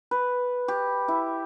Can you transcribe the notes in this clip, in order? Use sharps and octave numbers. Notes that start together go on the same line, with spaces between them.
B4
G4
E4